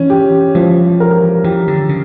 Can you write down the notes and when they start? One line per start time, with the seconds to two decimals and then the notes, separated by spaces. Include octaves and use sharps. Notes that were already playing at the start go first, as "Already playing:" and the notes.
Already playing: E3 C#4
0.10 G4
0.55 E3 F3
1.00 A#4
1.44 E3 G4
1.67 D3
1.89 C#3